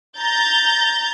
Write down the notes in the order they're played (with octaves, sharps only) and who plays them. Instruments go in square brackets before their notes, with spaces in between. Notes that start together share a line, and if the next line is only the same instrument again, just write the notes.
[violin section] A#5 G6 A6